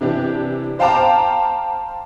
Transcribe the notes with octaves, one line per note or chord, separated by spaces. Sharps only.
C3 E3 D4 G4
C5 F5 G5 A5 A#5 D6